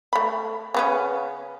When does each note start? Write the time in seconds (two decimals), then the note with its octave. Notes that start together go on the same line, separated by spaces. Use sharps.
0.13 A3 B5
0.74 C#3 B3 C#4